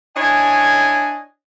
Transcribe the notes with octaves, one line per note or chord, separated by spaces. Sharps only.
D4 E4 C#5 D#5 G#5